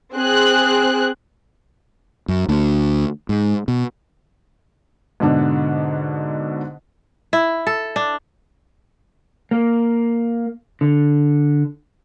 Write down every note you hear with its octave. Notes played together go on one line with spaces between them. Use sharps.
C4 G#4 F#6
F#2
D2
G#2
B2
G#2 B2 D3 D4
E4
A4
D4
A#3
D3